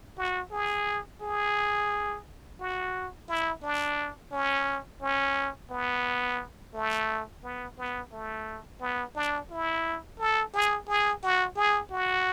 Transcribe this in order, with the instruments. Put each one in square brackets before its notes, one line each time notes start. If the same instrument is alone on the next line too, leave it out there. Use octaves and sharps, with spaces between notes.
[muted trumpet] F#4
G#4
G#4
F#4
E4
D4
C#4
C#4
B3
A3
B3
B3
A3
B3
D4
E4
A4
G#4
G#4
F#4
G#4
F#4